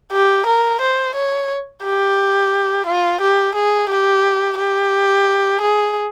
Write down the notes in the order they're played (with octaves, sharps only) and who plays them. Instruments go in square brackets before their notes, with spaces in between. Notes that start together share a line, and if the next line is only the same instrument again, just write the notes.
[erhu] G4
A#4
C5
C#5
G4
F4
G4
G#4
G4
G4
G#4